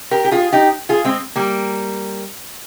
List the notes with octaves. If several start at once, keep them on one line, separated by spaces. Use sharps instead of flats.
G4 A#4
G4
F4 G#4
D#4 G4
F4 G#4
G#3 C4
G3 A#3